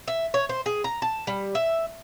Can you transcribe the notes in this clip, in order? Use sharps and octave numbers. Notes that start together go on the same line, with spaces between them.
E5
C#5
C5
G#4
A#5
A5
G3
E5